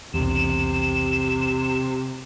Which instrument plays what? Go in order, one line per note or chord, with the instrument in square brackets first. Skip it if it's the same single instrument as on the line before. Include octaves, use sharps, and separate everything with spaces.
[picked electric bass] B1 E2 [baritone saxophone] C3 [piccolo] E7